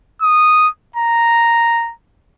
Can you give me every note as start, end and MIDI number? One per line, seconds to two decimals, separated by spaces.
0.22 0.68 87
0.96 1.93 82